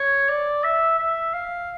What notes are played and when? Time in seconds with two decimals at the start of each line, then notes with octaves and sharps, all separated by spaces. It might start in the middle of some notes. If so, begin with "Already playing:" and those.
Already playing: C#5
0.28 D5
0.64 E5
0.99 E5
1.34 F5